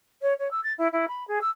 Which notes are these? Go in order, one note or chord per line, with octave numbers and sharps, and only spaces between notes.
C#5
C#5
E6
A6
E4
E4
B5
G#4
E6